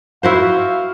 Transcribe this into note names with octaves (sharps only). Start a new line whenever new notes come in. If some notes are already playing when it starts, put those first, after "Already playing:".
E4 F#4 C5 F5